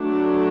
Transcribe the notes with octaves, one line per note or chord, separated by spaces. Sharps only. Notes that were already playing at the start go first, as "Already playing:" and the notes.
Already playing: F#3 A3 D4